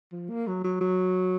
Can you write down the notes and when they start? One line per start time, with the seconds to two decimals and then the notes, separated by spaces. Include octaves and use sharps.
0.12 F3
0.30 A#3
0.47 F#3
0.64 F#3
0.81 F#3